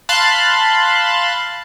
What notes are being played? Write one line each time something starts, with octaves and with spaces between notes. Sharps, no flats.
F5 A5 B5 C6 F#6 A6